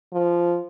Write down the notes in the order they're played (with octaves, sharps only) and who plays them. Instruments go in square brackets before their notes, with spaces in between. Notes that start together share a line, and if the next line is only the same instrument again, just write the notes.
[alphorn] F3